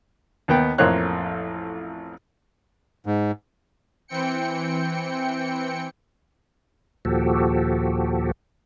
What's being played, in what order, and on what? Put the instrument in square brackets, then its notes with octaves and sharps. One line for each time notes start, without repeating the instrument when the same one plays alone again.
[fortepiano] D#2 D#3 B3 B4 G5
A1 F2 A#3 C5 C#5 F#6
[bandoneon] G#2
[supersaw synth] E3 C4 G5 C#7
[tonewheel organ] D#2 A#2 F3 F#4 G4 A4